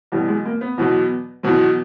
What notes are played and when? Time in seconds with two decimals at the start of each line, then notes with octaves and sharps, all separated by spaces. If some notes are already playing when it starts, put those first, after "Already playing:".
0.12 E2 B2 F#3 G3
0.28 G#3
0.45 A#3
0.61 B3
0.78 E2 B2 F#3
1.43 E2 B2 F#3